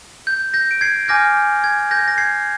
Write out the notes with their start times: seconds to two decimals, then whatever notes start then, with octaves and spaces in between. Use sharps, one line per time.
0.27 G6
0.54 G6 A#6
0.71 D7
0.81 G#6 C7
1.08 G#5 D6 F6 G6 A#6
1.64 G#6
1.91 G6 A#6
2.08 A#6
2.18 G#6 C7